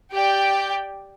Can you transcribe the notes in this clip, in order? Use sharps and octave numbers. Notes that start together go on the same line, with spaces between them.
G4 D5 G5